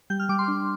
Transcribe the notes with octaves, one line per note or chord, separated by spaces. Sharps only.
G3 G6
F6
G3 D6
C6
D4